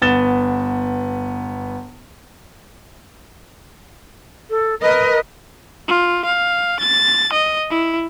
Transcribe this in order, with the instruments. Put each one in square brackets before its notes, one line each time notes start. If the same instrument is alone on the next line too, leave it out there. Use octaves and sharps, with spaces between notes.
[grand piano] G1 B3 A6 E7 G7
[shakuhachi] A4
[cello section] A#4 D#5 [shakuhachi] B4
[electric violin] F4
F5
A6
D#5
E4